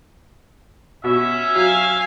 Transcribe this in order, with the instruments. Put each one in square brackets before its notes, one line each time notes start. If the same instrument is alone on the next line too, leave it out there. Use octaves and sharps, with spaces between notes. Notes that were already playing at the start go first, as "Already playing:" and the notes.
[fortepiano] B2 [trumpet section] C#4 E5
[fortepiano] F#3 [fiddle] F5 G#5